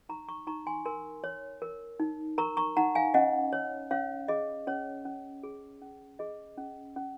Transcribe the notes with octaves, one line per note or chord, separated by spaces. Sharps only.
D#4 A#5 C#6
A#5 C#6
D#4 A#5 C#6
G#5 C6
A#4 G#5 C6
C#5
A#4
D#4
A#4 A#5 C#6
A#5 C#6
D#4 F#5 A#5
F5 G#5
C#4 D#5 F#5
C#5
C#4 C#5 F5
G#4 D#5
C#4 C#5
C#4
G#4
C#4
G#4 D#5
C#4
C#4